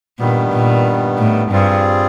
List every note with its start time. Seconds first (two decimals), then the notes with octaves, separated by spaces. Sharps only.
0.19 G2 A#2 D#3 G3 B3
0.52 A#2
1.18 A2
1.51 G2 G3 C4 F4 G#4